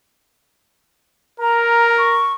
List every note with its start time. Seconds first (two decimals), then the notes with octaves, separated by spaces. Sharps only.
1.40 A#4 A#5
1.98 C#6